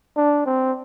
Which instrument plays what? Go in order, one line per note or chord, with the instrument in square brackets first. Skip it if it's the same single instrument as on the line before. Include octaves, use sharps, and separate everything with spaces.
[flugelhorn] D4
C4